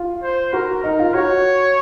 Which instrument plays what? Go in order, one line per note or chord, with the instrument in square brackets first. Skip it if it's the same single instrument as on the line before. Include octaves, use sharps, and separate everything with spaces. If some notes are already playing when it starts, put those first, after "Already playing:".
Already playing: [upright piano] F4
[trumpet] C5
[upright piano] F#4 [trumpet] A#4
[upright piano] D#4 [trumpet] A#4
[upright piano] F4
[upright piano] F#4 [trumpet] C#5